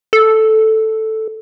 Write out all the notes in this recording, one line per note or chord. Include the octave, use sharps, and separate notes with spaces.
A4